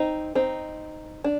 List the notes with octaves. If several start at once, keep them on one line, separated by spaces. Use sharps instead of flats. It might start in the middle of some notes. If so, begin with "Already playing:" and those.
Already playing: C4 D#4
C4 D#4
D4